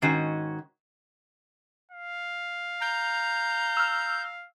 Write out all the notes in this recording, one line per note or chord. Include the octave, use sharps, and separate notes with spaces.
G#2 D#3 C#4 F#4
F5
A#5 G6
E6 F6